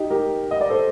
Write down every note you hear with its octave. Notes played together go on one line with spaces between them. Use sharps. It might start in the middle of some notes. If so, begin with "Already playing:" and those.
Already playing: D#4 G4
G4 A#4
D#5
D5
A4 C5